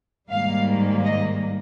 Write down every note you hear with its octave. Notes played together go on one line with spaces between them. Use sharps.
G#2 D#3 G3 A#3 F5
D#5